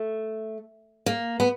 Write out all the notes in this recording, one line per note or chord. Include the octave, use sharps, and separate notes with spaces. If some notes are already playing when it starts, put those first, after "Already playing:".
Already playing: A3
A#3
B3